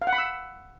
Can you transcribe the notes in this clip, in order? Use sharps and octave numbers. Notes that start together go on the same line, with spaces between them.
F5
F#5
B5
E6